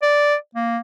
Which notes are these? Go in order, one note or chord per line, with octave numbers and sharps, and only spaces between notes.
D5
A#3